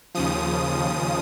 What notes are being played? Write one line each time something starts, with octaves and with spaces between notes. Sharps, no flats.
D#2 C#3 F3 D#6